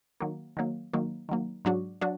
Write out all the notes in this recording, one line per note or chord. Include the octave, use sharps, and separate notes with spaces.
D#3 F#3 A#3
D#3 F#3 A#3
D#3 F#3 A#3
D#3 F#3 A#3
G#2 F#3 D4 F#4
F#3 D4 F#4